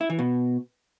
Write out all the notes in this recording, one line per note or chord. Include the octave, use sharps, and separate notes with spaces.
E4
E3
B2